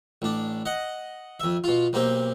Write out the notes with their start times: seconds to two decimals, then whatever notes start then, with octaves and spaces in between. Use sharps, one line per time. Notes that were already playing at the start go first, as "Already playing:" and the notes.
0.22 A1 D4
0.66 D#5 F#5
1.40 F2 E5
1.64 B2 F4
1.93 B1 A#3 C4 G4